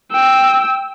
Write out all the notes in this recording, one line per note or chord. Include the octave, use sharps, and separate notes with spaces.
G5 E6